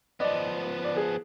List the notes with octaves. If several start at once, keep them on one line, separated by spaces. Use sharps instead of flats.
F3 B3 D5 D#5
D5
G#4